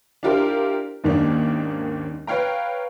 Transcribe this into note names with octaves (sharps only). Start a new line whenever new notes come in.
D4 E4 F4 G4 A#4 C5
D#2 G#2 D#3 A#3 C#4 D4
B4 C#5 F5 G5 A#5